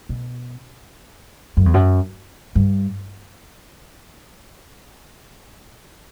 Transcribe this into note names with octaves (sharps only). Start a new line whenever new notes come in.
B2
F#2
E2
F#2
G2